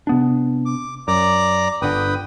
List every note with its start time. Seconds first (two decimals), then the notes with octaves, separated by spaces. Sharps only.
0.07 C3 B3 D4
0.66 D6
1.08 F#2 D5 A#5 D6
1.82 G1 D3 B4 G5 D#6